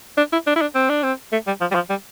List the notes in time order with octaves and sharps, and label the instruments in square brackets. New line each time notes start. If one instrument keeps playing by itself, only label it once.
[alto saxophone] D4
E4
D4
E4
D4
C4
D4
C4
A3
G3
F3
G3
F3
G3